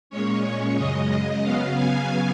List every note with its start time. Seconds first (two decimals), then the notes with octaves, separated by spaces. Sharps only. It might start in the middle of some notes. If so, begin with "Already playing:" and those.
0.10 A#2 G#3 C#4 C#5
0.43 C#5
0.76 F#2 C#3 G#3 D#5
1.09 D#5
1.42 C#3 F#3 B3 F5
1.75 G#5